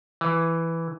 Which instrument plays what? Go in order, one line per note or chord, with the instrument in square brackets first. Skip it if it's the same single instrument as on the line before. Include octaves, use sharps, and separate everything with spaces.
[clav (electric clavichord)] E3